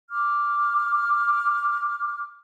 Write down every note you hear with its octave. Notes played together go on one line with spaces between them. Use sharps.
D6 F6